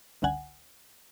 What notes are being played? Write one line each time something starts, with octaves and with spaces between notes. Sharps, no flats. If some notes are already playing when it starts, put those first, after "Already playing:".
G1 C#2 D3 F#5 G#5